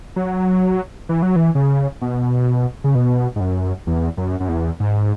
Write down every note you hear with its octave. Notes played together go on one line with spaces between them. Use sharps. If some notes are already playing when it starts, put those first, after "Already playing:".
F#3
E3
F#3
E3
C#3
B2
C#3
B2
G#2
F#2
E2
F#2
F#2
E2
G#2